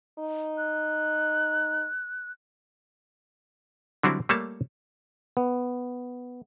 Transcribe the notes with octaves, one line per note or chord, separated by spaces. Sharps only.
D#4
F#6
D3 F#3 G3 C4 E4
G3 A3 A#3 C#5 A5
B3